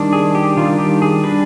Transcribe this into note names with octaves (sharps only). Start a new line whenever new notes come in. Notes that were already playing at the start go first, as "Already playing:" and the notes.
Already playing: D#3 G3 D4
G#4
G4
D#3 G3 D4 F4
G4
G#4
G3 D4 B4